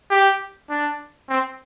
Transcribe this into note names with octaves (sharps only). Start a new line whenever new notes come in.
G4
D4
C4